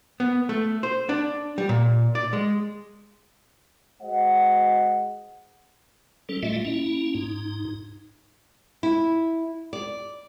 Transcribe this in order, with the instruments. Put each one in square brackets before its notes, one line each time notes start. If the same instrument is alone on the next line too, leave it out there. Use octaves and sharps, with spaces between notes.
[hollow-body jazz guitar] B3
A3
C5
D4
G3
A#2
D5
G#3
[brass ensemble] G#3 F#4 C5 D#5 F#5
[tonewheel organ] G3 C#4 A4
A2 G3 A3 F4 D#5 E5
A#3 C#4 E4
G#2 D#4
[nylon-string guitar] E4
D5